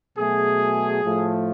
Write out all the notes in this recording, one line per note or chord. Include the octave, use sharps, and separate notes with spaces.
B2 F#3 A3 G#4
A2 F3 A3